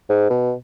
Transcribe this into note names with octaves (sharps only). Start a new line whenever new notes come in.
G#2
B2